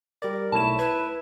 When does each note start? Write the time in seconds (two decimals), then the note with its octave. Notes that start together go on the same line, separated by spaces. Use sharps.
0.22 G3 A#4 D5
0.52 B1 A3 E4 C#5 A5 E7
0.79 B4 G#6